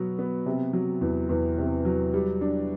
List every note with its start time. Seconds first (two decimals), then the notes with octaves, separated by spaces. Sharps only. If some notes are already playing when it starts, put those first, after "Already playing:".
Already playing: B2 F#3 B3 F#4
0.19 B3
0.46 C3
0.73 F#3
1.01 E2
1.29 E2
1.58 C3
1.85 F#3
2.14 G3
2.41 D4